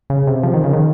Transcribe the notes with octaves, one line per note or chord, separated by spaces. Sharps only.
C#3
C3
F3
D#3
C#3
D#3